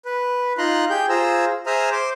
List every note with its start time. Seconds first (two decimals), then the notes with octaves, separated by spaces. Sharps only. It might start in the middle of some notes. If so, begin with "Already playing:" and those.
0.06 B4
0.58 D#4 F4 A#5 C6 F#6
0.90 G4 G#4 G5 G6
1.09 F4 G#4 C5 A#5 E6
1.66 G#4 C5 E5 A#5 D#6 F6
1.92 C5 C6 D6